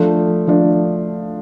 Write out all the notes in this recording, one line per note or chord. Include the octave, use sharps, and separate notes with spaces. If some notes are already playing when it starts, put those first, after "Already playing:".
Already playing: F3 A3 D4
F3 A3 D4